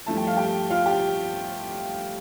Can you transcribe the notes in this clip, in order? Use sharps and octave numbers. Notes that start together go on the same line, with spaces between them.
G2 F3 A3 E4 A5
G5
F5
G4 G5
F4 F5
G4 G5